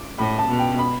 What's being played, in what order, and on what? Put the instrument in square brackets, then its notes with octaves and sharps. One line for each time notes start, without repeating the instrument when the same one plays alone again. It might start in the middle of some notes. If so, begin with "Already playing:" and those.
Already playing: [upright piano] D6
[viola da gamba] A2 [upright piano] B5
[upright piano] A5
[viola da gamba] B2
[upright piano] G5
B5